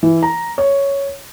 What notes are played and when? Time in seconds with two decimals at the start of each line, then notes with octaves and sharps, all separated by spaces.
0.03 E3
0.23 A#5
0.58 C#5